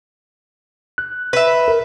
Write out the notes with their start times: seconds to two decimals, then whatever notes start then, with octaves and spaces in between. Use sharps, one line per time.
0.98 F#6
1.33 B4 E5
1.68 A#4